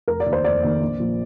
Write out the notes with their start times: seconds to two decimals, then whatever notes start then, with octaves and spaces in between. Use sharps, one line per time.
0.08 F1 A#4
0.20 D5
0.26 D#2 D#3 A#3
0.33 C5
0.44 F1 D5
0.63 D#2 D#3 A#3
0.81 A#1
1.00 A#2 F3